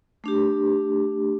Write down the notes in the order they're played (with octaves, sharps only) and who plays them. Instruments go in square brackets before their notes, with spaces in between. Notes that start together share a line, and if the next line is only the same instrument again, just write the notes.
[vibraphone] A3 D4 G4